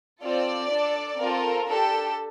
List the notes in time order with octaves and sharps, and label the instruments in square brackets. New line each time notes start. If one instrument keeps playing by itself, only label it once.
[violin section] C4 F4 A4 D5
D4 A4
C4 F4 A4 A#4
D4 G4 A4